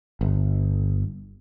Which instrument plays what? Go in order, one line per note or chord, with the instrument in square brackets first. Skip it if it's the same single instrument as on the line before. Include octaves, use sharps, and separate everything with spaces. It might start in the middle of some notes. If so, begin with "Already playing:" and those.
[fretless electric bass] G1